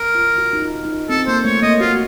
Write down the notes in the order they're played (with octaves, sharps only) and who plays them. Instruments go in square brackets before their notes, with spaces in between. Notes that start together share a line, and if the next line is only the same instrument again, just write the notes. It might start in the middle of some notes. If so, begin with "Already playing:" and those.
Already playing: [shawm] A#4
[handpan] F4
F#4
D#4
F4
D#4
[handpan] C4 [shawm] A4
[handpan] A#3 [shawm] C5
[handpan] A3 [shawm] C#5
[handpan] A#3 [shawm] D#5
[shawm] F4 [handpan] F#4